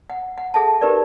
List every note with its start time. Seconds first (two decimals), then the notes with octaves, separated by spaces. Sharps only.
0.10 F#5
0.38 F#5
0.54 G#4 A4 E5 F#5 A5
0.81 D#4 G4 A#4 B4 D5